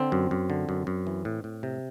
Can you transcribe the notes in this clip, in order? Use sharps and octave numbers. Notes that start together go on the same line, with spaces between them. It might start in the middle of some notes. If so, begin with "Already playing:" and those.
Already playing: D3 C4
F#2
F#2
D3
F#2
F#2
E3
A2
A2
C3